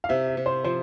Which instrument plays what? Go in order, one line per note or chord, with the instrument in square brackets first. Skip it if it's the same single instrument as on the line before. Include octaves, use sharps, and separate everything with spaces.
[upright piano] F5
[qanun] C3 [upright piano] E5
[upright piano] E5
[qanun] C3
[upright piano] C5
[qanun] F3 [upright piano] C5